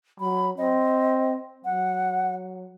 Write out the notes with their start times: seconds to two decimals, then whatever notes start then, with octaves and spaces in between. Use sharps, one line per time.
0.20 F#3 B5
0.58 C4 D#5
1.65 F#3 F#5